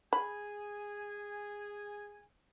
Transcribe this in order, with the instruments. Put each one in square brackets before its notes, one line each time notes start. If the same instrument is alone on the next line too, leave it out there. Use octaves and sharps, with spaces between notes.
[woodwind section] G#4 G#5 [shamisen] B5